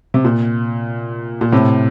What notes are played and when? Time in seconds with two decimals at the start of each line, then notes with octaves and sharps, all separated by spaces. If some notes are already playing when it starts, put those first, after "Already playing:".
0.14 C3
0.25 A#2
1.41 A#2
1.52 A2 C3